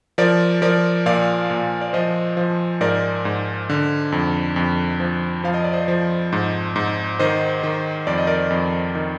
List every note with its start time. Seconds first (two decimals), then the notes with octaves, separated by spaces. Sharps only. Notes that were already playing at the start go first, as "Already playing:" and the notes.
0.18 F3 A#4 D5
0.62 F3 A#4 D5
1.06 A#2 D5 F5
1.50 A#2
1.81 D5
1.93 F3 C5 D#5
2.37 F3
2.81 G#2 A#4 D5
3.25 G#2
3.70 D3
4.12 F2
4.56 F2
5.00 F3
5.44 F3 F5
5.54 D#5
5.64 D5
5.73 C5 D#5
5.88 F3
6.32 G#2
6.76 G#2
7.20 D#3 C5 D#5
7.63 D#3
8.07 F2 D5
8.18 D#5
8.27 A#4 D5
8.51 F2
8.95 D#3